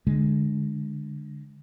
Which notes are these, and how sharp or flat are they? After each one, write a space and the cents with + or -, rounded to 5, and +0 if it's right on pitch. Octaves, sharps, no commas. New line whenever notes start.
D3 +0 G#3 +0